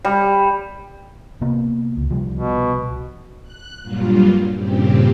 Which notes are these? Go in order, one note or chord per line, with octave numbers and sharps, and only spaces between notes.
G3
C3 A#3 B3
C#2
C2 F3 G3
B2
F#6
G2 A#2 F#3 G3 F4
G2 A#2 C#3 C4 G4